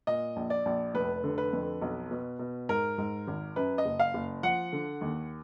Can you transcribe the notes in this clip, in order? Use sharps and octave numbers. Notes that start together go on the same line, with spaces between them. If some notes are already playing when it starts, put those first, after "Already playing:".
A#2 D#5
A#1
D5
A#1
F1 B4
D3
B4
F2
B1
B2
B2
G#2 A#4
G#2
G#1
F#2 B4
D#5
F#1
F5
F#1
F3 F#5
D3
D#2